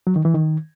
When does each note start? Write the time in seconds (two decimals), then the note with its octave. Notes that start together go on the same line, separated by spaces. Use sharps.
0.07 F#3
0.16 D#3
0.25 E3
0.34 D#3